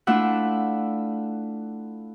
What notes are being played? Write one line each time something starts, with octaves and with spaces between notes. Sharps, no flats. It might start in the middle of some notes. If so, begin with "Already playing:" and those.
A3 D4 E4 F4 E5 F#5